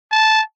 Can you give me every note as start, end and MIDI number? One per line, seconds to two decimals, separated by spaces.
0.11 0.41 81